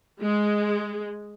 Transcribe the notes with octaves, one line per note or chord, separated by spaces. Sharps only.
G#3